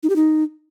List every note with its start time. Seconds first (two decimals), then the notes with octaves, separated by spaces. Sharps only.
0.03 D#4
0.10 G4
0.16 D#4